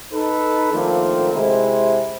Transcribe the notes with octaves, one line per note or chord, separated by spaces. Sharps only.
D#4 A4 B4
D#3 F3 A3 A#3 C4 D4
C3 G#3 E4